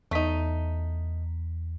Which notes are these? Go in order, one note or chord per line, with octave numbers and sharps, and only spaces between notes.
E2 A3 D#4 B6